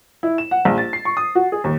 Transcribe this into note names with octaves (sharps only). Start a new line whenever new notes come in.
E4
E7
F#5
A#1
A6
C7
C#6
D#6
F#4
G#4
D#2